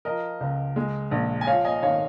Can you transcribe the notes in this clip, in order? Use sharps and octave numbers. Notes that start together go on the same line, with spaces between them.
F3 A#4 D#5
C#2
G#3
A#1
G#5
F3 C#5 F5
D#5 G#5
G#1 C#5 F5